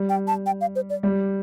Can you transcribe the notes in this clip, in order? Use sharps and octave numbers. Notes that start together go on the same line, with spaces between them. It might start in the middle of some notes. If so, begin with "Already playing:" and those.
Already playing: G3
G5
A5
G5
F5
C5
D5
G3